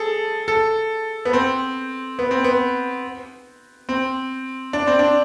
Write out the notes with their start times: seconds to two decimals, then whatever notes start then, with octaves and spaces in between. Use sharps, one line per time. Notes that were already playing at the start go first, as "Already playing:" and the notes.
Already playing: G#4 A4
0.48 A4
1.25 B3
1.33 C4
2.19 B3
2.31 C4
2.44 B3
3.89 C4
4.73 D4
4.87 C4
4.99 D4